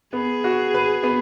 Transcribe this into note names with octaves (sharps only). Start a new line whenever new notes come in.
B3 G#4
F#4
B4
B3